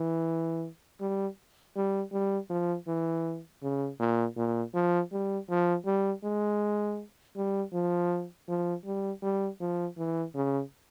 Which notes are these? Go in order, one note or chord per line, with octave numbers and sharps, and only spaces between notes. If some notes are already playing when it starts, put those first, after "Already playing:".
Already playing: E3
G3
G3
G3
F3
E3
C#3
A#2
A#2
F3
G3
F3
G3
G#3
G3
F3
F3
G3
G3
F3
E3
C#3